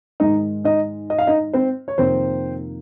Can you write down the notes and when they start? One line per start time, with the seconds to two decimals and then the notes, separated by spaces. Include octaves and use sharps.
0.20 G#2 D#3 G#3 D#4 D#5
0.64 D#4 D#5
1.10 D#5
1.18 F5
1.27 D#4 D#5
1.53 C4 C5
1.88 C#5
1.98 F2 C3 D#3 A#3 C4 C5